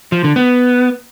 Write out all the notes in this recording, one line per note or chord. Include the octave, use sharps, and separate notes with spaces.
F3
D3
B3